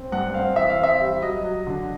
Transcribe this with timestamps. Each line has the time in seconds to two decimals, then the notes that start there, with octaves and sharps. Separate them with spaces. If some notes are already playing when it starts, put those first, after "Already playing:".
Already playing: C4
0.12 G2 F#5
0.34 C4 F5
0.56 E3 E5
0.70 F5
0.79 C4 E5
1.01 G3
1.22 F#3 D#5
1.44 F#3
1.67 D3